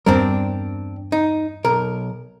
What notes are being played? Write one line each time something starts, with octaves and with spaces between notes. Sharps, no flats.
E2 G2 G3 C4 D4 A#4
D#4
B1 A#4